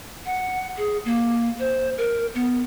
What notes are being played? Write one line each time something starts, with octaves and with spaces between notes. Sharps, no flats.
F#5
G#4
A#3
C5
A#4
B3